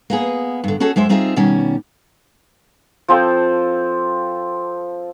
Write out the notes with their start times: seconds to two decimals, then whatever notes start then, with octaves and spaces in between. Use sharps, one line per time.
0.10 A#3 B3 G#4
0.64 G2 D3
0.80 C#4 F#4 G#4 A4
0.96 F#2 G#3 C5 E5
1.09 G3 C4 D#4 F4 G#4 E5
1.36 B2 D#3 G3 C#4
3.08 F3 C4 A4 G5